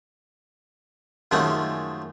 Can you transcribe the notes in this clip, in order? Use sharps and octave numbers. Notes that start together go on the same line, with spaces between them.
F#2 D#3 F3 G#3 A3 C#4